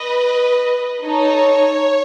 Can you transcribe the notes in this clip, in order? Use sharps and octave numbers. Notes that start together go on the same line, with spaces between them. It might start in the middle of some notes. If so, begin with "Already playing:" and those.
Already playing: B4 D#5
D#4 A4 C#5